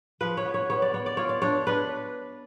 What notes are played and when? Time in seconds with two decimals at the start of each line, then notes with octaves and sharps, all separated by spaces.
0.21 F3 B4
0.37 C#5
0.45 B3
0.54 C#5
0.70 B3 C#5
0.82 D5
0.94 B3 C#5
1.06 D5
1.17 F4 C#5
1.29 D5
1.42 D4 C#5
1.67 D4 B4